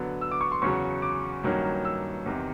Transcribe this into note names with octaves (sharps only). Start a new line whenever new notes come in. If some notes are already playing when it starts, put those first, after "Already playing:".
Already playing: D3 F#3 B3
E6
D6
C#6
C6
E2 C#3 F#3 C#6
D6
G2 D#3 F#3 A#3 C#4
E6
E2 C3 D#3